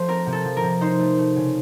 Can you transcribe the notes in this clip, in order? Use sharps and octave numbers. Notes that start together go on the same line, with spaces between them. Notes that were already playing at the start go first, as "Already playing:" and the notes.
Already playing: F3 A3 C5
C4 A#4
C3
A4
F3
A#4
C3
D#4 C5
A3
A3
C#3